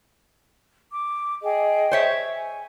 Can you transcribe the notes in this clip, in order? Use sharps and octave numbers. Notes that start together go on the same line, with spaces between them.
D6
G#4 D#5 G5
C5 C#5 E5
G#5